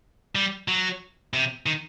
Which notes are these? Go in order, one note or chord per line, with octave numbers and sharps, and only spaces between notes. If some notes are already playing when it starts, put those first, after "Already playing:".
G3
F#3
C3
D#3